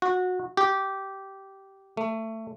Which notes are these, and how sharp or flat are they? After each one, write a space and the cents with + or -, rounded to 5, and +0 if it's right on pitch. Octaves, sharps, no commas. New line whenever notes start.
F#4 -20
G4 -15
A3 +20